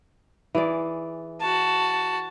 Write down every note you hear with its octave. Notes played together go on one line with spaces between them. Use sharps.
E3 G#4 D5
F#4 A5